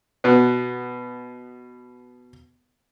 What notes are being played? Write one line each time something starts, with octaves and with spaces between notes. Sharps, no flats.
B2 B3